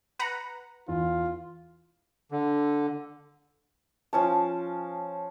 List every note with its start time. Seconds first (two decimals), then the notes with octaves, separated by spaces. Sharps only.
0.19 B4 F#5 A#5
0.88 E2 F4
2.32 D3
4.13 F3 C#4 A5